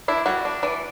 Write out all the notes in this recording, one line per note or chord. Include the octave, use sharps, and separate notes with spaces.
D4 E4
G3 F#4
D4
E3 D5